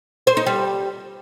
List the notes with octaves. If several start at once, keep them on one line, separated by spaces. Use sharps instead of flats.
C5
D#4
G3